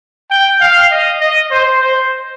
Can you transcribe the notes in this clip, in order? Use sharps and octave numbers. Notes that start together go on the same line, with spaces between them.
G5
F5
D#5
D#5
C5
C5